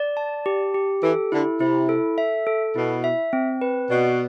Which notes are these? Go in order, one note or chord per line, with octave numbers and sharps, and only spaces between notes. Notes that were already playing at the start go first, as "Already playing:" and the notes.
Already playing: D5
A5
G4
G4
E3 A4
D3 E4
C3 E4
A4
E5
A4
B2 E4
E5
C4
B4
B2 D5